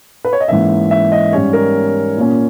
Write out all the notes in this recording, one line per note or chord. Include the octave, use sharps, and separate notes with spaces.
B4
C#5
D#5
G#2 E3 A#3 C#4 E5
E5
D#5
G#2 G3 C#4 C#5
A#4
A#2 A#3 C#4